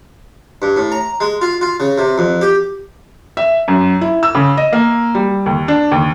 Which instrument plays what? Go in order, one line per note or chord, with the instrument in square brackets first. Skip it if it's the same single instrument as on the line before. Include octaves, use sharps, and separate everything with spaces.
[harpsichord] G2
A2
A#5
G#3
F4
F4
C#3
C3
F2
G4
[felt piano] E5
F#2
E4
E6
C#3
D#5
A#3
G3
D#2
D4
D#2